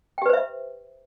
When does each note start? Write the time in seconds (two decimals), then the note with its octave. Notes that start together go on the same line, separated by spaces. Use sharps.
0.18 G5
0.22 G4
0.26 B4
0.30 C5
0.33 E5